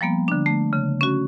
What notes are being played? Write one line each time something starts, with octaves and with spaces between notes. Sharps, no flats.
F3 G3 A#3 B3
D3 D4
A3
C#3
C#4 F#4